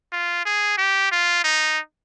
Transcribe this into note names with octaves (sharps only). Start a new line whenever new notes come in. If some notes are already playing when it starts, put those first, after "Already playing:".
F4
G#4
G4
F4
D#4